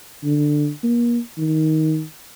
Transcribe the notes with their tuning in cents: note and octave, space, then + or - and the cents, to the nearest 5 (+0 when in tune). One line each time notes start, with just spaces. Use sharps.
D3 +10
A#3 +35
D#3 +15